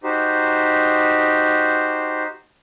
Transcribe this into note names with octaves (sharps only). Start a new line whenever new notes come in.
D#4 F#4 G4 C5